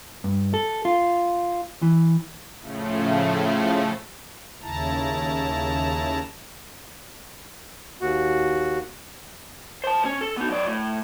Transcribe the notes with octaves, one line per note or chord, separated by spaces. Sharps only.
G2
A4
F4
E3
A2 C#3 F3 A3
D#2 C#3 E4 A5 A#5
D#2 F#4
C5 A5
C#4
A4
B3 D#4
F#2 D5
A2